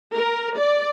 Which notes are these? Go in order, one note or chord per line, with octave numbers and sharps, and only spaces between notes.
A#4
D5